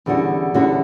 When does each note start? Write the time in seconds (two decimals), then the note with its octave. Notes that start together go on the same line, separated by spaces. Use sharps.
0.06 E2 D3 G3 C#4 F#4
0.54 E2 D3 G3 C#4 F#4